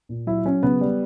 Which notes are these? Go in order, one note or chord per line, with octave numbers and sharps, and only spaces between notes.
A#2
F#3 E4
F#3 C#4
C#3 B3
G3